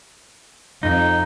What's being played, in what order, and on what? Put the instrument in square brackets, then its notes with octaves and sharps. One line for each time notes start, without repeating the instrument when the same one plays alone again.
[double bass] F2 [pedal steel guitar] D#4